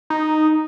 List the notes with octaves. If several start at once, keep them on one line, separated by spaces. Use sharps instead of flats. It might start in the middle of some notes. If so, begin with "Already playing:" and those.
D#4